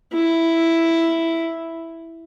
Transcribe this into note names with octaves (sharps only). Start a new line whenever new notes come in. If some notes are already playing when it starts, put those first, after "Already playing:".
E4